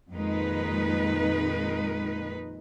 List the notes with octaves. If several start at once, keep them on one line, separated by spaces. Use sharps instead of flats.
F2 A#2 D#3 G#3 D#4 B4